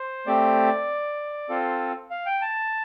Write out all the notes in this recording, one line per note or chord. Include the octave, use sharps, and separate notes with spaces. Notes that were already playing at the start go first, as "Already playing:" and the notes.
Already playing: C5
A3 C4 G4 D5
C4 F4 A4
F5
G5
A5